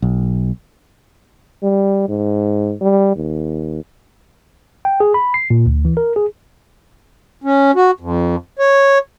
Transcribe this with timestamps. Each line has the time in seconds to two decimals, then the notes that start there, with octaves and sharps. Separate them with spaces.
0.02 B1
1.63 G3
2.09 G#2
2.81 G3
3.16 D#2
4.85 G5
5.00 G#4
5.14 B5
5.34 C7
5.50 A#2
5.66 D2
5.85 E3
5.97 A#4
6.16 G#4
7.44 C#4
7.75 F#4
8.00 F2
8.59 C#5